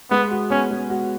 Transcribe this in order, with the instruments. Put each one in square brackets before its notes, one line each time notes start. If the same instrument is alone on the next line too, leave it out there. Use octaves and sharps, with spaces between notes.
[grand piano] G#3 [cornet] B3
[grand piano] F#4
[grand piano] B3 [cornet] C#4
[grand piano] G#3
F#4